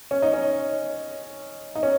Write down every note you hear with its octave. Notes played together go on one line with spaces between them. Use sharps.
C#4
D#4
C#4
D#4
C#4